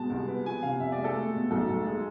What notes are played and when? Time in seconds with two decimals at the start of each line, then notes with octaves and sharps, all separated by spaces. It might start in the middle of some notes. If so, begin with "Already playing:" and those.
Already playing: B2 G#3 A5
0.10 C2
0.28 B3
0.45 F3 G#5
0.63 C3 F5
0.80 F2 E5
0.92 D5
0.98 G#3
1.04 A4
1.15 A3
1.34 B2
1.51 B1 A4
1.69 B1
1.85 G#3